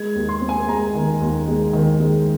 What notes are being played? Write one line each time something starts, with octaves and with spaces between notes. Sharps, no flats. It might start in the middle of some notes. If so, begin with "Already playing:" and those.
Already playing: G#3 G#6
D#2
C6
C4
G#5
G#3 A#5
D#3
D#2
G#3
D#3
G#3